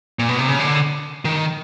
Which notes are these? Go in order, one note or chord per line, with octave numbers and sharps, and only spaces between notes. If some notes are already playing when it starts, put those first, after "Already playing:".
A#2
B2
C3
C#3
D3
D#3